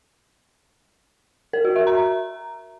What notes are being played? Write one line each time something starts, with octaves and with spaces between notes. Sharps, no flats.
A#4
F#4
E5
A#5